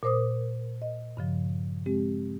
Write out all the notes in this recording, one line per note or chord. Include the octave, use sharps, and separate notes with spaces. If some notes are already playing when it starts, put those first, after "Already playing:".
A#2 A#4 C5 D6 D#6
D#5
G2 C#3 F3
G#3 C4 G4